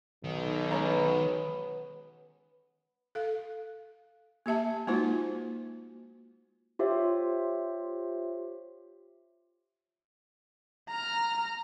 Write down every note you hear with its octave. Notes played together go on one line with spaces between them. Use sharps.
B1 D#3
G#3 B3 C#4 A#5
A4 F5
A#3 G4 E5 A5
G#3 A#3 D#4 F4 F#4 C5
F4 G4 C5 C#5 E5
A#5 F6